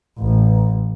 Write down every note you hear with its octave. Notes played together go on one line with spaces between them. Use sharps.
A1